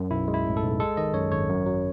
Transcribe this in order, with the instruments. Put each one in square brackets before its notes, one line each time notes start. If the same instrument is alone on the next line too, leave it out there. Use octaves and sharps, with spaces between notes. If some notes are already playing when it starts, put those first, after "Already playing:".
Already playing: [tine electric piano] F#2
B1 E4
G#3
E4
A2
A4
B1
G#3 A4
D#3 D#5
F#2 C#5
G#1 C#5
F#2
F#3